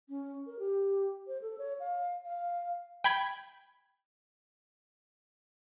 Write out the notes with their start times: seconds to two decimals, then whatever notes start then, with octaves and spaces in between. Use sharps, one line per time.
0.09 C#4
0.47 A#4
0.59 G4
1.27 C5
1.42 A4
1.58 C#5
1.80 F5
2.26 F5
3.04 G5 B5 G#6